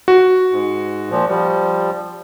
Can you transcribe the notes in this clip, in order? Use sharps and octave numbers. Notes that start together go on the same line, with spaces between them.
F#4
G#2
A#2 F3
F3 G3